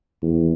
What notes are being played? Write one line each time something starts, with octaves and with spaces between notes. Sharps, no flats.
E2